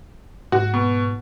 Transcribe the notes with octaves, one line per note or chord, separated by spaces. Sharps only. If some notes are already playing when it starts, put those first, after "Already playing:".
G#2 F#4
B2